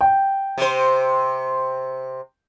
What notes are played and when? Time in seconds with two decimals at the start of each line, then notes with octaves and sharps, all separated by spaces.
0.01 G5
0.58 C3 C5